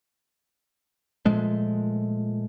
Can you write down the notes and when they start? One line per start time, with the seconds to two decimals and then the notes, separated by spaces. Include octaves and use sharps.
1.25 A#2 F3 G#3 A3